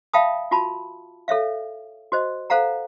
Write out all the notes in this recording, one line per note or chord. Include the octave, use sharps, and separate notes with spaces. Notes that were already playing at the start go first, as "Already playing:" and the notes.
E5 F5 G5 A5 B5 D#6
F4 F#4 A5 B5
A4 C#5 E5 F5
F#4 C5 D#5
A4 C5 F5 F#5 A#5